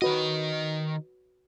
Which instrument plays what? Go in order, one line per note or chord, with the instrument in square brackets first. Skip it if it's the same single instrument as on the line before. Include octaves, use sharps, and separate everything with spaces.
[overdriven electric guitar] D#3 D#5 [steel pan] F#4 B4